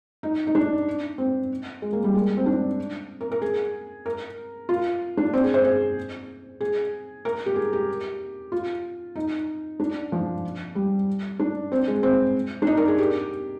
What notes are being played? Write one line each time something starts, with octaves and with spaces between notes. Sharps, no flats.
D#4
D#4
D4
C4
G#3
A#3
G3
G#3
C4
D4
A#4
A#4
G#4
A#4
F4
D4
C4
G#4
C5
G#4
G#4
A#4
G4
G#4
G4
F4
D#4
D4
F3
G3
D4
C4
G#3
C4
D4
D#4
A#4
G#4
G4